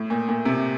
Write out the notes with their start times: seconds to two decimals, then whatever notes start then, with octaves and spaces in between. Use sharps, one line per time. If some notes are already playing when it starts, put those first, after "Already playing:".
Already playing: A2
0.10 A#2
0.28 A#2
0.45 C3